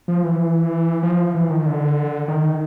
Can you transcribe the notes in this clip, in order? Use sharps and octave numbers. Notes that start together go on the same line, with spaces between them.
F3
E3
F3
E3
D#3
D3
D#3